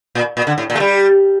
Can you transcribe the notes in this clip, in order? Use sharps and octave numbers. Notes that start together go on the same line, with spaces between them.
A#2
A#2
D3
A2
A#2
A3
G3